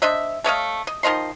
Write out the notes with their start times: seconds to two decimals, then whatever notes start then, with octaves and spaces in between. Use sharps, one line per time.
0.02 D4 C5 D#5 E5
0.44 A3 C#5 D#5 F5
0.87 D#5
1.03 D#3 F3 D#5 C6